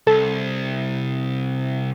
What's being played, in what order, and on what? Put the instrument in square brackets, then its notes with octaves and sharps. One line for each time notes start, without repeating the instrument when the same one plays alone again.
[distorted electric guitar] C2 [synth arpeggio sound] A4